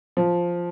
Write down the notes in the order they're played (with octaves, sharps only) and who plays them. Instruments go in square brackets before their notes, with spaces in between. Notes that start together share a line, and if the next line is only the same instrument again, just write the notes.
[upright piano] F3